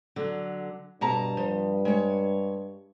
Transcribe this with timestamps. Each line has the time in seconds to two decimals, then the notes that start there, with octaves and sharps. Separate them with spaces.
0.16 D3 F#3
1.01 G2 B2 A5 A#5
1.37 F3
1.85 G#3 C#5